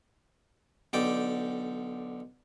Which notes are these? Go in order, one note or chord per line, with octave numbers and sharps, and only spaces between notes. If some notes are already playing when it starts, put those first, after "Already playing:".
B1 D3 D5 G5 D6